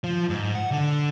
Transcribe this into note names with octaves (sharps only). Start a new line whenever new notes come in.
F3
G#2
F#5
D3